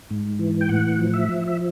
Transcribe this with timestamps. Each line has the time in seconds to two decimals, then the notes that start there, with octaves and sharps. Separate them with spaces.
0.10 G#2
0.39 E3
0.61 G5
0.69 A2 F#5
0.99 F3
1.13 E5
1.29 F3
1.47 E5